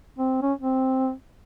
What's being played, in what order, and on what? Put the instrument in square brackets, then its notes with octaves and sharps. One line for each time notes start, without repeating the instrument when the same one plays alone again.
[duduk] C4
C#4
C4